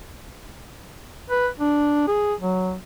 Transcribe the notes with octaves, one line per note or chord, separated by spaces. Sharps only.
B4
D4
G#4
F#3